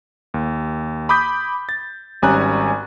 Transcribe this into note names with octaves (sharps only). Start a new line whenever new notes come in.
D#2
B5 D6 D#6 G6 B6
A6
G#1 G3 C#4 G#5 A#5 F#6